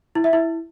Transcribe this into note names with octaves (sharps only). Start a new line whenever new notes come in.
E4
E5
E4